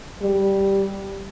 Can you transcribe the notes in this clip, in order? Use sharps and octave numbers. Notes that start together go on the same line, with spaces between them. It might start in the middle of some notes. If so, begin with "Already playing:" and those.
G3